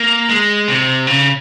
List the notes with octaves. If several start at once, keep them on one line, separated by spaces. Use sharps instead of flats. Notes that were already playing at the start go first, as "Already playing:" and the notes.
Already playing: A#3
G#3
C3
C#3